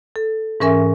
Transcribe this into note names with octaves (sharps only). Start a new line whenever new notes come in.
A4
G#2 E3 C#4 A#4 E5 G#5